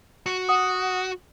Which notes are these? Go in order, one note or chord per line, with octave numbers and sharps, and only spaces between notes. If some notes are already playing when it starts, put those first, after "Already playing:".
F#4
F#5 D#6